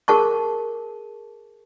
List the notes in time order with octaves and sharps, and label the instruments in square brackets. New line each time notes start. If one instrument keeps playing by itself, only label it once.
[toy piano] G#4 A#4 A5 C#6